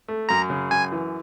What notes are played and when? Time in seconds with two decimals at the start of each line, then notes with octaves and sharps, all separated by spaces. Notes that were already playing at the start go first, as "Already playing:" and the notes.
0.08 A3
0.29 F#2 A#5
0.50 C#3
0.71 F#2 G#5
0.92 E3